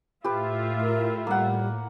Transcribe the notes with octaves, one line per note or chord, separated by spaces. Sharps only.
A2 F4 G4 B4 E5
A#4
G3 A#3 F#5